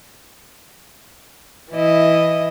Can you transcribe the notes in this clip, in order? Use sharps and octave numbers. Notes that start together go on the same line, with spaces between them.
E3 E4 D#5